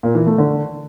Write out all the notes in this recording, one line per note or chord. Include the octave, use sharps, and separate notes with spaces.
A#2
E3
A3
D3